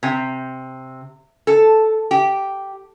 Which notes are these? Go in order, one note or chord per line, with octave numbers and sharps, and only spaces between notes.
C3
A4
G4